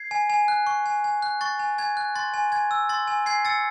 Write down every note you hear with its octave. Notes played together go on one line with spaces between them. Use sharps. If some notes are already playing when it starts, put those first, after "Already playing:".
Already playing: G#6 C7
G#5
G#5
F#6
C#6
G#5
G#5
F#6
C#6 A6
G#5
G#5 G#6
F#6
C6 A6
G#5
G#5 G#6
E6
C6 A6
G#5
G#5 G#6 C7
E6 A6 C#7